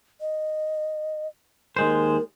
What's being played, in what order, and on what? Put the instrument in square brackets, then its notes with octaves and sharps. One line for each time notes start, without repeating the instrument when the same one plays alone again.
[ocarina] D#5
[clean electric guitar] D#2 G#3 C5 [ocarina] A#4